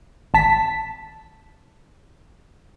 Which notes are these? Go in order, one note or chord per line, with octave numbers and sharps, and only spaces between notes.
G#1 A5 B6